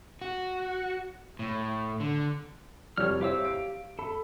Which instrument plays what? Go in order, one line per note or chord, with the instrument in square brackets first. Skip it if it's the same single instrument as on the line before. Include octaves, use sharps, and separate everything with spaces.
[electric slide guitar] F#4
A2
D3
[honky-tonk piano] F1 G3 D5 [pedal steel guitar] C#5 F6
[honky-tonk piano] E4 C5 C#5 [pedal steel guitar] G4 F5 E6
[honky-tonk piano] D7
[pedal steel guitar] A4 [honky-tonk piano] B5